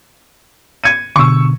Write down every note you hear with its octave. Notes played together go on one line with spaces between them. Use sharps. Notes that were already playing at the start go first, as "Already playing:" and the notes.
G#6 C#7 D#7
B2 D3 C#6 E6